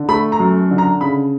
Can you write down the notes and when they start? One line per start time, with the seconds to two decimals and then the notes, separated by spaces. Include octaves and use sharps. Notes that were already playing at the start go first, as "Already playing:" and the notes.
Already playing: D3
0.09 A3 B5
0.32 A#5
0.40 F#2
0.71 D3
0.78 A#5
1.01 C#3 B5